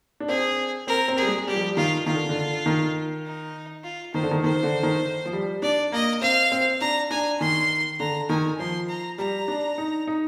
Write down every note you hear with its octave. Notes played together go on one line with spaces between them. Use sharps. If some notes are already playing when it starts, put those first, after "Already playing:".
D4
C4 G#4
C4 A#4
C4
G3 G#4
G#3
G3 G4
F3
G3
D#3 F4
D#3 F4
D3
D3
D#3
D#4
F4
D#3 C5
D3
D#3
D#3 C5
D3
D#3
F3
G3
D4 D5
A#3 D#5
C4 F5
C4
D4 A#5
D4 G#5
D#3 C6
D3 A#5
D#3 G#5
F3 C6
A#5
G3 A#5
D4
D#4
D#4